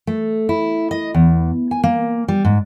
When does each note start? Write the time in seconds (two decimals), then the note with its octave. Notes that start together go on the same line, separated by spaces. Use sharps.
0.07 A3
0.49 E4
0.91 D#5
1.14 E2
1.71 G#5
1.84 A#3
2.28 G3
2.45 G#2